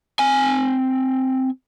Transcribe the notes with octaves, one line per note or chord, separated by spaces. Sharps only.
C4 G#5